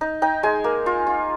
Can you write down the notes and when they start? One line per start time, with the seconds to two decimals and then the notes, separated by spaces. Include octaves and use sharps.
0.01 D#4
0.22 D#4 G5
0.43 G#3 G#5
0.64 A#3
0.86 F4
1.07 F4